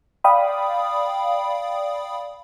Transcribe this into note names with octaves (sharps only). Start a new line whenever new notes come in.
D5 F5 G5 B5 D#6